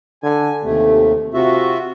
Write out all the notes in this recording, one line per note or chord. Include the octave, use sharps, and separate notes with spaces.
D3 G#5
D#2 C3 A3
C3 F4 F#4 E5